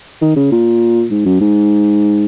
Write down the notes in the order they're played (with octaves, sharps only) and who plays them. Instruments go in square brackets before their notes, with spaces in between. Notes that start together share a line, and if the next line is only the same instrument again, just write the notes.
[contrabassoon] D#3
C#3
A#2
G#2
F#2
G#2